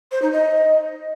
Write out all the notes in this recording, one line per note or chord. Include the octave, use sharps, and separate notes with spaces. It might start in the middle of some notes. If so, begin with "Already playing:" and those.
C5
D#4
D#5